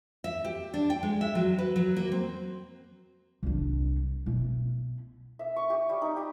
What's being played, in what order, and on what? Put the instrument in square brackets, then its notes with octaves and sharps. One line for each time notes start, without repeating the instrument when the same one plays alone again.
[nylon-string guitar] E5
G4
D4
G5
G#3
E5
F#3
B4
F#3
A#3
C4
[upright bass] C2 D4
B2 E4
[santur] E5
C#6
G4
G3
D#4
G4